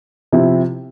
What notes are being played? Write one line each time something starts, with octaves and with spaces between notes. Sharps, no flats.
C3 F3 C4 E4